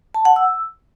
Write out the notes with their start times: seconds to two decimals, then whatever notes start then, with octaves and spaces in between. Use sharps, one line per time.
0.15 A5
0.25 F#5
0.36 E6